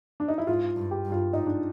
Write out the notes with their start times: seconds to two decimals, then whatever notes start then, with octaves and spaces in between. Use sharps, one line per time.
0.20 D4
0.28 D#4
0.38 E4
0.47 G#2 F4
0.76 G2
0.91 G4
1.05 G2
1.12 F4
1.33 G#2 D#4
1.46 D4